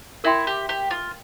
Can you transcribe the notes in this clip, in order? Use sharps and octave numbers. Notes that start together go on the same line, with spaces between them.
E4 A#4 E5 G5 C6
G4
G4
F4